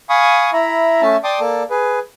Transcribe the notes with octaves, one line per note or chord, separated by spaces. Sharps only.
F5 G#5 B5 C#6 D#6
E4 E5 A#5 B5
A3 C#4 E5 A5
D5 G5 A5 C6 D6 D#6
A#3 A4 D5 A5
G#4 B4